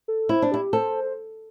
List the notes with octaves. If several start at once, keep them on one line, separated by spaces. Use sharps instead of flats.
A4
E4 C5
D4
E4 G4
A4 C5